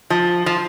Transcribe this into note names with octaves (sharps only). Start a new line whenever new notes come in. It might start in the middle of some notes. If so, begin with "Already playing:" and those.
F3
F3